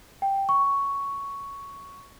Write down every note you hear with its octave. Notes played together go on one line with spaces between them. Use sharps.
G5
C#6